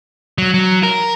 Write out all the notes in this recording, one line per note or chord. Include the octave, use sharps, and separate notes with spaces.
F#3
F#3
A#4